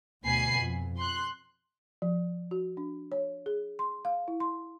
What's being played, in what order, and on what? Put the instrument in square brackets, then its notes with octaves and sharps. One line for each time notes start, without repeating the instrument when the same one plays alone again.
[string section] D2 B2 G#5 B5 C7
F2
C6 F#6
[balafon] F3
F#4
D4
C#5
G#4
C6
F5
E4
C6